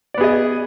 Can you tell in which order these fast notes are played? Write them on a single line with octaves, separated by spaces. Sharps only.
D5 B3 G#4 D#5